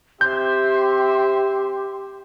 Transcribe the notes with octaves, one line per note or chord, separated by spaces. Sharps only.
C4 G4 C5 E5 C6 G6